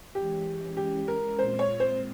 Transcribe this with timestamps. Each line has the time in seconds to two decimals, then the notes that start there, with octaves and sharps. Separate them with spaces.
0.15 E3 G#3 C#4 G4
0.77 G4
1.08 A#4
1.38 A#2 G#3 C4 F4 C5
1.59 C#5
1.80 C5